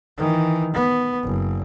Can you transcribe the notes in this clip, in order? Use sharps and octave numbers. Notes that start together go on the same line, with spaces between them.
D#3 E3
B3
F#1